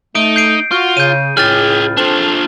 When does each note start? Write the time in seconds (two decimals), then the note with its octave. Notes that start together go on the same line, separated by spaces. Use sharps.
0.15 A3 D#4 D7
0.36 G6 C7 D7
0.71 F4 F#4
0.97 C#3 G6 D#7
1.37 C#2 A2 G#4 G5 F6 A6
1.97 C4 D4 F4 A4 C5